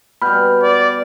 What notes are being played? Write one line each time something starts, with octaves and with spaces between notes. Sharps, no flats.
B2 G3 B5 F6 G6
D5